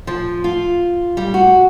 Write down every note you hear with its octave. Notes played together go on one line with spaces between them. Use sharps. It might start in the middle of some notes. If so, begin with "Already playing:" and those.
F3
F4
G3
F#4